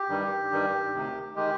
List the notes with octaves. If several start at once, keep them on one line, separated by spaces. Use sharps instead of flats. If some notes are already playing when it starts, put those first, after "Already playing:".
Already playing: G4
G2 D#3 G3
G2 D#3 G3
D2 C3 D#3
D#3 G#3 G4